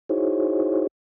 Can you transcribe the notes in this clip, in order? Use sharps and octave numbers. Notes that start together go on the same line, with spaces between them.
D#4 E4 F#4 G#4 C5 C#5